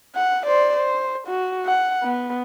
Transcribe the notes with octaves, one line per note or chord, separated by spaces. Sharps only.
F#5
C5 D5
C5
F#4
F#5
B3